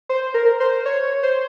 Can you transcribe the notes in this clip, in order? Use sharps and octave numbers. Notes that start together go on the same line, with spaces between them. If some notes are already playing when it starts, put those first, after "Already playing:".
C5
A#4
C5
C#5
C5